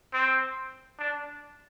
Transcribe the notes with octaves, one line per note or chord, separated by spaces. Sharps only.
C4
D4